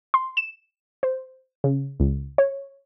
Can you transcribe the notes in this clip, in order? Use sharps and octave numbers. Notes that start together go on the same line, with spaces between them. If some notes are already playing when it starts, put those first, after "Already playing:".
C6
E7
C5
C#3
C#2
C#5